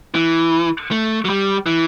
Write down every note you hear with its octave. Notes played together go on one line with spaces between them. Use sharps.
E3
A3
F#3
G3
E3